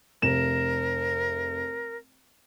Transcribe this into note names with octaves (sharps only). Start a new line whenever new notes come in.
F1 A#4 E7